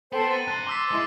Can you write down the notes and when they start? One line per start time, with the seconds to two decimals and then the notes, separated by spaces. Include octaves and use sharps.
0.12 B3 A4 C5 G5
0.31 A#5 A6 D#7
0.48 G2 C5 F#6
0.67 C5 D6 E6 B6
0.91 G#3 E4 D#5 C6